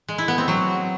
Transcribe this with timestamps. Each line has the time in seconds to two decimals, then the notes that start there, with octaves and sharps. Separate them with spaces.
0.08 G#3
0.18 E4
0.28 B3
0.38 C4
0.48 F#3